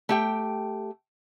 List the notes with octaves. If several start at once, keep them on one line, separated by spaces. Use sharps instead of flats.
A3 G4 G5